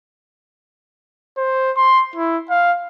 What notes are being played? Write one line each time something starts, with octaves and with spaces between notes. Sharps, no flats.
C5
C6
E4
F5